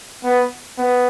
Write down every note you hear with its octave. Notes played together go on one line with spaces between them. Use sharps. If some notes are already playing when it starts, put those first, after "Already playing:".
B3
B3